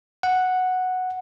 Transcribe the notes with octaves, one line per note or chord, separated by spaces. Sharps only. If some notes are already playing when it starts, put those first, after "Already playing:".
F#5